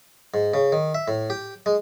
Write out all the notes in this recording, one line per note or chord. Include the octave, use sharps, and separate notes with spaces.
G#2
C#3
D#3
E5
A2
G4
G#3